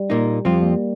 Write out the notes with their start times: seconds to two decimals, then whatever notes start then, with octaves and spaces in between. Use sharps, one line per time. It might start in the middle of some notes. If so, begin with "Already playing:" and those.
Already playing: G3
0.10 A#2 A#3 D#4
0.45 F2 F3 G3 C4 F4
0.63 A#3